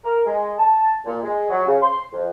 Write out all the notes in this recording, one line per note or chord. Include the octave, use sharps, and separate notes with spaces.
A#4
G#3
A5
A#2
G#3
F#3
C#3
C6
F2